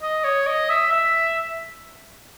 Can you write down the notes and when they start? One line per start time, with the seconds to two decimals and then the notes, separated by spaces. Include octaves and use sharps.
0.02 D#5
0.24 C#5
0.47 D#5
0.70 E5
0.92 E5